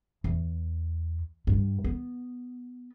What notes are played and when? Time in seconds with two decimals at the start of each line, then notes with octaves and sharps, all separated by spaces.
0.24 E2
1.47 G2
1.84 B3